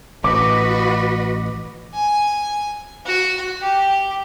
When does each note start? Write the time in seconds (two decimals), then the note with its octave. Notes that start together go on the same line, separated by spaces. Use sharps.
0.24 A1 F#4 B4 D#5 D6
1.94 G#5
3.06 F#4
3.61 G4